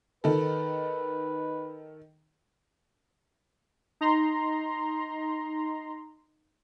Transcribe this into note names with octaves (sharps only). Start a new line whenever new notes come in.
D#3 A4 B4
D#4 A#5 C6